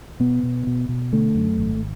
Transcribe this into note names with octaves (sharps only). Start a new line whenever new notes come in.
B2 B3
B2
B2
B2
D3 A3
F#2
G#1